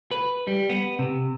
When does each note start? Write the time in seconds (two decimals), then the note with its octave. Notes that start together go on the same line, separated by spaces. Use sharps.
0.11 B4
0.47 G3
0.70 B3
0.99 C3